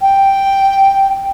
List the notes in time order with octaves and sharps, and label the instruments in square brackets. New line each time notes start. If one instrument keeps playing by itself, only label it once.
[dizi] G5